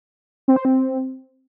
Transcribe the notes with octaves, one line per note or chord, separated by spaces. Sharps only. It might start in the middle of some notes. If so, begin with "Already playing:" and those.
C4
C5
C4